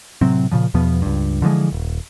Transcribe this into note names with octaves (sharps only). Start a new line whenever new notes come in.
A2 C3 F#3 C4
A#2 C#3 F3
E2 B2 F3 B3
C#2 G2
D3 E3 F3 G#3
D#1